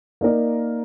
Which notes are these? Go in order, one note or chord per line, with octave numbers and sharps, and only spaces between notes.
A#3 D#4 A#4 D5